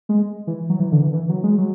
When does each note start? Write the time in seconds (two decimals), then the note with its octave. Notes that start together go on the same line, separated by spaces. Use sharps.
0.09 G#3
0.47 E3
0.70 F#3
0.80 E3
0.92 D3
1.02 E3
1.13 E3
1.29 F#3
1.44 G#3
1.58 F#3